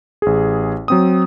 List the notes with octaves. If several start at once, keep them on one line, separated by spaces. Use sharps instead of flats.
A1 G#4
F#3 C4 D#6